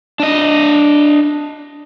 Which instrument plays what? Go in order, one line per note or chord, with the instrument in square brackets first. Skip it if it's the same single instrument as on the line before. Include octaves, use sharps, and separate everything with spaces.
[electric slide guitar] D4 D#5